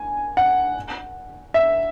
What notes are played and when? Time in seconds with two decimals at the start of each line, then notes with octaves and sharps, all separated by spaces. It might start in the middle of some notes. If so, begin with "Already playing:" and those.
Already playing: G#5
0.37 F#5
1.54 E5